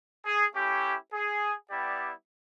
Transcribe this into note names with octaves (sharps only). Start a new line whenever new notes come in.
G#4
A3 C#4 E4 G4
G#4
G3 B3 E4 G4 D5